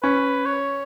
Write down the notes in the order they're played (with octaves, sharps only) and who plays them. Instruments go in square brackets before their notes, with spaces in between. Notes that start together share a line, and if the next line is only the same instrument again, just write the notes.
[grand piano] C#4 [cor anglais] B4
[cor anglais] C#5